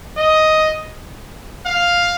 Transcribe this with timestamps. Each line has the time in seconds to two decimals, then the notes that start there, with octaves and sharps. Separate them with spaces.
0.17 D#5
1.66 F5